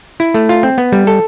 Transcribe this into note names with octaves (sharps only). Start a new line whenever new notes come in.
E4
A3
F4
C4
B3
G3
A4